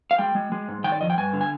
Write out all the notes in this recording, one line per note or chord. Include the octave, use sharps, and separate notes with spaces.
F5
G#3 G5
G#3
G#3
G#2
D#3 G5
D5
F2 D#5
G5
G2 G#5
D3
G#5